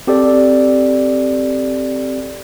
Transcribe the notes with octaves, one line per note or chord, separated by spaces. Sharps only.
C4 G4 A4 D5